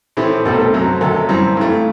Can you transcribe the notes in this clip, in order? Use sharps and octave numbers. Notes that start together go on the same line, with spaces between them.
A2 E3 A3 C4 G4
C2 B2 A3 C4 A4
A4
F#2 F#3 C4
D2 C3 F#3 A4
F#2 E3 G3 C4
G2 E3 A3